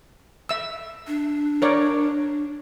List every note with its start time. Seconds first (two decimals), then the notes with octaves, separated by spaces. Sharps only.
0.49 E5 E6
1.07 D4
1.62 A#4 C#5 D5